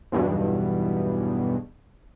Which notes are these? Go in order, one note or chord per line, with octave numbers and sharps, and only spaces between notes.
B1 E2 G2 B2